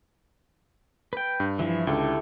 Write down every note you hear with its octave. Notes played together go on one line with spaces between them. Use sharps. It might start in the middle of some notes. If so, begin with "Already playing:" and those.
B4 G5
G2
E3 F3 E4
C#2 D3 E4 G4 A4